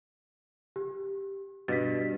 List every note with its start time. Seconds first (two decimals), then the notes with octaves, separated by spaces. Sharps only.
0.76 G4
1.68 G2 B2 A6 B6